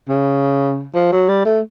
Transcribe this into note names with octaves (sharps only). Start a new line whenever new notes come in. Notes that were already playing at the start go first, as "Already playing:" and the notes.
C#3
F3
F#3
G3
A3